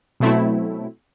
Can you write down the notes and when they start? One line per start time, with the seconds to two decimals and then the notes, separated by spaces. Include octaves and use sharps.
0.20 B2 F#3 A3 C4 E4